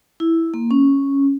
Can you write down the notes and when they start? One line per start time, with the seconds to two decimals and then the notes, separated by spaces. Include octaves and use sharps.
0.20 E4
0.54 A#3
0.71 C#4